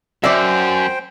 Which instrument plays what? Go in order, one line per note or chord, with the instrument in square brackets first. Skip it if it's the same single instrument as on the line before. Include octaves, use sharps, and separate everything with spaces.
[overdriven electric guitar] F#2 [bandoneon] C5 G5 [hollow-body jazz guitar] D5 E5